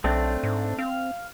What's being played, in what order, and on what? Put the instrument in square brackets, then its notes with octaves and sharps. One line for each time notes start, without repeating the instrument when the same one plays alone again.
[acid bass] B1 [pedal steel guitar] A3 C4 D4
[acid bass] G#2
[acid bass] C4 [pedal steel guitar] F5